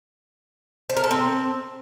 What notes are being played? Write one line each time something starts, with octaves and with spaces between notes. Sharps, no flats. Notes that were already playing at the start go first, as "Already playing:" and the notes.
C5
A#4
A4
C4